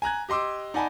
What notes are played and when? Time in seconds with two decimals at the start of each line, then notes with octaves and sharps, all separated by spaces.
0.02 G#5 A#5 F#6 G#6
0.29 G4 D#5 C6 D6 E6
0.74 D#4 D5 F#5 G#5 A5 B5